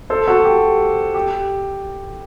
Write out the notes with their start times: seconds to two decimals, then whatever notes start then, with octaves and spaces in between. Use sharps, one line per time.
0.10 A4 C5
0.28 F#4 A4
0.44 G4
1.15 G4